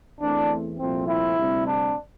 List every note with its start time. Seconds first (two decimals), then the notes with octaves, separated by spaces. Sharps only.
0.20 E2 E3 A3 C4 D4
0.78 C2 A#2 F3 A3 C4
1.07 C4 E4
1.36 D2 C3 G3 C4
1.65 D4